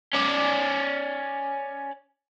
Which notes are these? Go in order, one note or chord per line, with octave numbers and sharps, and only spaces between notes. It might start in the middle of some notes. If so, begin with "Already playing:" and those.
C#4 D5